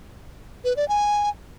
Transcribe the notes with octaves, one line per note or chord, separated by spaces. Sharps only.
B4
D5
G#5